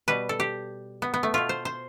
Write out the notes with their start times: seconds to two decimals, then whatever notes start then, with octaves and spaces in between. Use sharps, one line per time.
0.08 B2 G3 B4
0.29 A4
0.40 G4
1.02 B3
1.14 B3
1.23 A3
1.34 B2 A3 F4
1.49 C5
1.65 C5